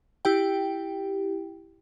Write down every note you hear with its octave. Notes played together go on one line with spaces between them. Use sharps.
E4 G4 G5